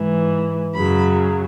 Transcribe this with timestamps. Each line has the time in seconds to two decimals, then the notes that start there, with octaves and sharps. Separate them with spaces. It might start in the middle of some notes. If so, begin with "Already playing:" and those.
Already playing: G#2 E3
0.76 F#2 C#3 F#3 B5